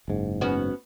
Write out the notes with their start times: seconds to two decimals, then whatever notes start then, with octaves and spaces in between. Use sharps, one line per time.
0.08 F#1 G#2
0.41 B3 C#4 F#4